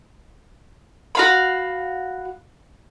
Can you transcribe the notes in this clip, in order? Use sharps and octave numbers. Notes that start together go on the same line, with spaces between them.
F#4 F5 B5